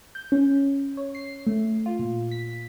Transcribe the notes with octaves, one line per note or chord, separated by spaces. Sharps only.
G6
C#4
C#5
C7
A3
F4
A#2
B6